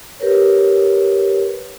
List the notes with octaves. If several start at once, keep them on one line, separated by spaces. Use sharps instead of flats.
G4 A#4 B4 C#5